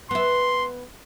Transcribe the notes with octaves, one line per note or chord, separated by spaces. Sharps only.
B3 E5 C6